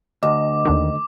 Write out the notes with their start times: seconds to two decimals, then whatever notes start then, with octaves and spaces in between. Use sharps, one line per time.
0.23 D2 D#5 D6
0.65 D#2 D3 D#3